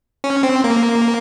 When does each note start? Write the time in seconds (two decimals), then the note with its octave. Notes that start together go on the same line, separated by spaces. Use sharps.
0.24 C#4
0.43 C4
0.64 A#3